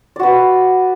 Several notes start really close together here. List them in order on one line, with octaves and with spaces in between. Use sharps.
D5 F#4 B4